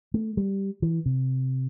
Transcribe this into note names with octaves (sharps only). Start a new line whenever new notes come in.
A3
G3
E3
C3